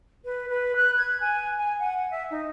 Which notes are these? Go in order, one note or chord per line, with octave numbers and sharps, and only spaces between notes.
B4
B4
F#6
G#6
G#5
G#5
F#5
E5
D#4